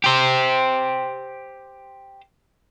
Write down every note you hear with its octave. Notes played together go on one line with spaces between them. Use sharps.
G4 C5